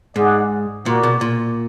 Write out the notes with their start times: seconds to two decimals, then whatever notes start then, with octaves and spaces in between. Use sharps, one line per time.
0.16 G#2 D#4 G#4 D5 F#5
0.86 A#2 F#4 A#4 D5
1.03 B2
1.21 A#2